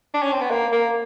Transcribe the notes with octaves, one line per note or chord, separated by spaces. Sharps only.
D4
C#4
C4
B3
A#3
A#3